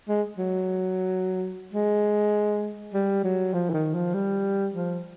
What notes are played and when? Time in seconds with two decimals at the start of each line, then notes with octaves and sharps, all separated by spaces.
0.09 G#3
0.38 F#3
1.73 G#3
2.94 G3
3.24 F#3
3.54 F3
3.70 E3
3.74 D#3
3.94 F3
4.14 G3
4.74 F3